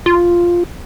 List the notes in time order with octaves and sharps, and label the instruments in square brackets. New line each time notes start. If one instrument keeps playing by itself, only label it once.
[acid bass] F4